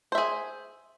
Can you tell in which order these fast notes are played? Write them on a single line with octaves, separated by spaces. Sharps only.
C5 E5 G#4